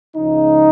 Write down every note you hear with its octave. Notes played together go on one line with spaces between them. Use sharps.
C#2 C#3 F3 D#4